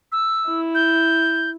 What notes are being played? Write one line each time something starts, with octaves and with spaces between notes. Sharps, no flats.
E6
E4
G6